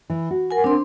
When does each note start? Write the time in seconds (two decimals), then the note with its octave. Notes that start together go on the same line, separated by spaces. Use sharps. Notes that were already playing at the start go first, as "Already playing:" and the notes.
0.10 E3
0.31 F#4
0.51 A#4 F#5 G#5
0.64 C4 D4 C6